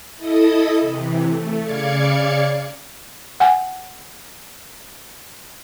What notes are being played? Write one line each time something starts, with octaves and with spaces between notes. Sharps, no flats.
E4 A4 D#5 D#6
C3 E3
A3
C#3 D5 F5 G#6 C#7
F#5 G#5